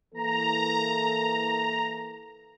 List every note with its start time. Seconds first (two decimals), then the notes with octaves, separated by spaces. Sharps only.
0.14 E3 A#3 A4 A#5